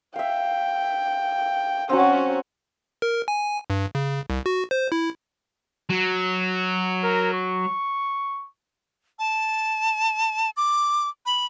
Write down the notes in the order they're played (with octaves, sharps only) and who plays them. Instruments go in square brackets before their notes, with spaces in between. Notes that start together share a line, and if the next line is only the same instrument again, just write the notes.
[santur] E5 F5 [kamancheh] G5
[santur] F#3 C4 [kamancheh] C#4 F#4
[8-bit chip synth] A#4
G#5
G2
C#3
C2
F#4
C5
E4
[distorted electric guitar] F#3
[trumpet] A#4
C#6
[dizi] A5
D6
B5